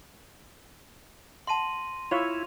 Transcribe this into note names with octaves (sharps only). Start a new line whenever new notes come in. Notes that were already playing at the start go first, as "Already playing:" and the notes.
F#5 A5 C6 A#6 D#7
E4 F4 C#5 E5 F7